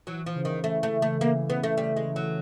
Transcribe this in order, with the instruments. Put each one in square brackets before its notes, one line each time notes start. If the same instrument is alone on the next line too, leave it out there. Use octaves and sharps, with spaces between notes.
[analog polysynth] E3 [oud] F#3
[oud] F3
[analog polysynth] C#3
[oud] D#3
[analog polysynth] E3 [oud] A3
[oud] A3
[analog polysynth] E3
[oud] A3
[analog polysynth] E3 [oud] A#3
[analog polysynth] C#3 [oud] B3
[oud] A3
[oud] G3 [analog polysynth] A3
[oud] G#3
[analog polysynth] C#3
[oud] F#3